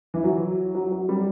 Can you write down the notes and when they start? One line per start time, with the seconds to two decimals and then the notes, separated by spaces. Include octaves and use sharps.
0.14 E3
0.24 F#3
0.75 F#3
0.92 F#3
1.09 G3